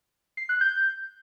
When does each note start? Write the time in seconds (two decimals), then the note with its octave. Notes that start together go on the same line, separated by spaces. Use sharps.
0.37 C7
0.49 F#6
0.61 G6